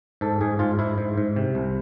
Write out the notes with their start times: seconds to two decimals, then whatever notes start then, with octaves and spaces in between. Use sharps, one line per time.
0.21 G#2 A4
0.41 G#2 G#4
0.59 G#2 F4
0.79 G#2 E4
0.98 G#2
1.18 G#2
1.36 C3
1.55 C2